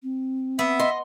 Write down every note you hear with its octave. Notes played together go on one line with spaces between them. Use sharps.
C4
B3 E5
D#5 C6